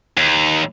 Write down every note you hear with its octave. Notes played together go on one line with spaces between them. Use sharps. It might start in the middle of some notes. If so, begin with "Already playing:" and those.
D#2